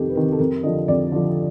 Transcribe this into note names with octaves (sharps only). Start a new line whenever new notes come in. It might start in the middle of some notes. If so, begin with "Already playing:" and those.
Already playing: F2 C3 D#3 G4 A4
B4
C3 D#3 A#4
A4
F2 A#4
D3 F3 D#5
F2 D5
D3 F3